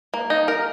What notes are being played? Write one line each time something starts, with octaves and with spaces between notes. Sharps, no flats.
A#3
D#4
A#4